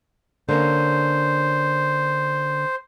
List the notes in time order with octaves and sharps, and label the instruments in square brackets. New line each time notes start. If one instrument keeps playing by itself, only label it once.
[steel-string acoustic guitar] D3 A#3 C#4 [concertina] C5